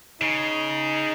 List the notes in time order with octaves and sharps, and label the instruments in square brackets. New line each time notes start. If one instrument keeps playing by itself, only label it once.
[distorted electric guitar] C#3 [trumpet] D#4